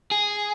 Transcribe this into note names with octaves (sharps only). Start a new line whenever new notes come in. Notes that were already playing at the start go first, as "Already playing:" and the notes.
G#4